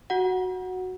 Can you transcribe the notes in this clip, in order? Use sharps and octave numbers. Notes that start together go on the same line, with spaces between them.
F#4 F#5